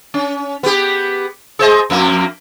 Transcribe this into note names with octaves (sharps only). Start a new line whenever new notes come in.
C#4
B3 G4
G#4 C5 D#5
F2 A#3